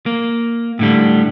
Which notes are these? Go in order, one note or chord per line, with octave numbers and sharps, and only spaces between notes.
A#3
A2 D3 G3